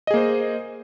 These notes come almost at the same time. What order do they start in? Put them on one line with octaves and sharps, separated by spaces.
D#5 G#4 A#3 C5